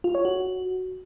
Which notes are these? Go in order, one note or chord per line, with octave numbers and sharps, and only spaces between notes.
F4
C#5
F#4